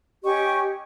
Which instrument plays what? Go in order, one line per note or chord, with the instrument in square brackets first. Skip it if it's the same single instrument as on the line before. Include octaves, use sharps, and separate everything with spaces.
[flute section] C#4 G4 D#5 C#6